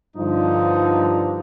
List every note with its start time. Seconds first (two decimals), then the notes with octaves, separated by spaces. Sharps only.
0.16 G2 D3 F3 D#4